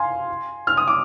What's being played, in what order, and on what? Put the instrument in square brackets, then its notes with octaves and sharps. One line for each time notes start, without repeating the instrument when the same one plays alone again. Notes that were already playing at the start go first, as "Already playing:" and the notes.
Already playing: [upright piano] F5 G#5 C6
F6
D#6
D6